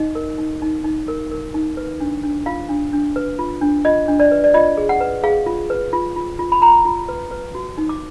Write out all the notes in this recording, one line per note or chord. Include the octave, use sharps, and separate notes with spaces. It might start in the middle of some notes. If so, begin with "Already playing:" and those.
Already playing: D#4 D#5
A#4
D#4
D#4
D#4
A#4
A#4
D#4
B4
D4
D4
F4 F5
D4
D4
B4
F4
D4
F4 D#5
D4
D5
B4
D5
F4 D#5
G#4
F#5
B4
G#4 F5
F4
B4
F4
F4
F4
B5
F4 A#5
F4
B4
B4
F#4
D#4
D6